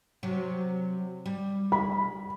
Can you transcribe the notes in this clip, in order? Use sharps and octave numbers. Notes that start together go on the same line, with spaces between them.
C3 F#3
G3
B5